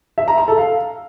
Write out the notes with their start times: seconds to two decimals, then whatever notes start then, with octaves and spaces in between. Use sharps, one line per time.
0.18 E5
0.28 A#5
0.38 A#5
0.48 A4
0.58 F5